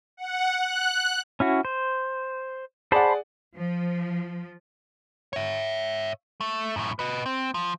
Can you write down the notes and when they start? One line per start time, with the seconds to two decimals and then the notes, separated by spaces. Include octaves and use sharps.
0.17 F#5
0.57 F#6
1.40 C#4 E4 F#4
1.65 C5
2.92 G#4 C5 D5 F#5 A5 B5
3.56 F3
5.33 C#5 E5
6.41 A3
6.76 F#2 A2
6.99 B4 D#5
7.26 C4
7.54 F3